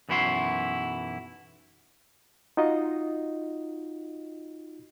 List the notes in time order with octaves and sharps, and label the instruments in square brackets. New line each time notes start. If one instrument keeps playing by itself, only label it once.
[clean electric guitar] B1 F#2 E3 E4 F#4 C6
[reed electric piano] D#4 F4 F#4 D#5